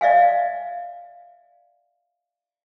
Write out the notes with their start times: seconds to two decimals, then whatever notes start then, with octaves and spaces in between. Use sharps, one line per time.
0.01 D5 E5 F5 G#5